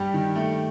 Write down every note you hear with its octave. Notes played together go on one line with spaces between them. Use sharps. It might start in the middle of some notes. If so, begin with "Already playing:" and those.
Already playing: G2 G3 G4
D#3
A3